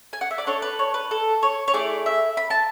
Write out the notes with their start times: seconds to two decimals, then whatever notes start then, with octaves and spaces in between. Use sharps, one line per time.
0.13 G#5
0.21 F#5
0.31 E5
0.38 D5
0.47 D4 A4 C#5
0.62 B4
0.79 C#5
0.94 B4
1.11 A4
1.43 C#5
1.68 C#5
1.73 A3 E4 G#4 D5
2.06 E5
2.37 B5
2.50 A5